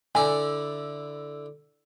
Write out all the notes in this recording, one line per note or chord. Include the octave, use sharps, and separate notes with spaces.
D3 E4 D5 G#5